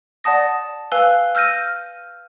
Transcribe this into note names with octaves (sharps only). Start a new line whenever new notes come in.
D5 F#5 A5 D#6 A#6
B4 F5 G#5 E6 F#6 G7
E6 F6 G6 A#6 D#7